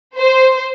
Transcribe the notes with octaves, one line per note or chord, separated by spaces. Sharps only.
C5